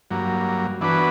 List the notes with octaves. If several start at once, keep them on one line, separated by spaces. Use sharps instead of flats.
G2 F#3 A#3
E3 B3 D4 F#4 B4